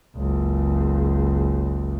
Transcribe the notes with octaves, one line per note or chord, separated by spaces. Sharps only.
F#1 C#2